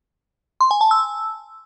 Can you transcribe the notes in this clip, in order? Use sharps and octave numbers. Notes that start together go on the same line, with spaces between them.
C6
G#5
A5
E6